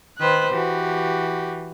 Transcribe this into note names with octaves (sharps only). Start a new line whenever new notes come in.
D#3 B4 C5 F#6
E3 F#4 G4